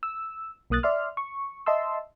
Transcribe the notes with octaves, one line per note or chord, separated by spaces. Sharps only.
E6
B1 A#3 D#6 F#6 A6
D5 E5 C6 F6
C#6
D#5 E5 A5 C6 E6